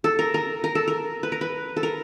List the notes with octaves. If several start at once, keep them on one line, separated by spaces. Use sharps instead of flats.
A4
A#4
A#4
A#4
A4
A#4
B4
A#4
B4
A4
A#4